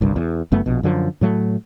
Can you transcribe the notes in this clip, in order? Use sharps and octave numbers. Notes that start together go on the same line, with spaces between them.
G1 C2 G2
E2
F#1 F#2 A3 B3
A#1 B2
F#2 D3 E3 F3
A2 F#3 A3